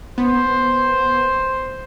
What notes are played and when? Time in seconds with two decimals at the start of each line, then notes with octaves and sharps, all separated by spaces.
0.18 B3 C5